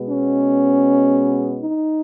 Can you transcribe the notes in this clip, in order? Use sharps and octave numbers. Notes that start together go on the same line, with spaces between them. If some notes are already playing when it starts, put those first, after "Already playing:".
Already playing: B2 G#3 B3
C#4
D#4